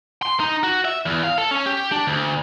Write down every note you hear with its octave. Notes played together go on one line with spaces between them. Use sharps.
C6
D#4
F#4
E5
E2
F5
A4
C#4
G4
D4
D2